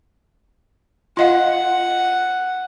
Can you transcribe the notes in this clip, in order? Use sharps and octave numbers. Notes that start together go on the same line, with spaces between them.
F4 D#5 F5 F#5